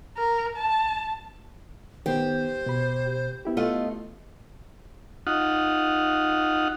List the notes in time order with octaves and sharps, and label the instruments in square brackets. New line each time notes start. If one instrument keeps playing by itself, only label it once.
[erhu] A#4
A5
[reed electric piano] D#3 B3 [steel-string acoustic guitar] G4 [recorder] C5
[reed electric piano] B2 B5
B3 E4 G4
[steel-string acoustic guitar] A3 F4 D#5
[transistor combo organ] D#4 F4 F#5